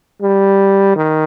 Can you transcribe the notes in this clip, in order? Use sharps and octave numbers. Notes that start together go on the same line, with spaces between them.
G3
D#3